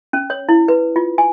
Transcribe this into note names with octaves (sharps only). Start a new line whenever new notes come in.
C#4
C#5
E4
B4
F4
G#5